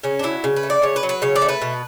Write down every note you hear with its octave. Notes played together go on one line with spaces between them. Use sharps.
C#3 C#4
D4
F#3 E4
C#3
B4
A3
D5
C#3 C#5
B4
F#3
B4
C#3 C#5
D5
A3
B4
B2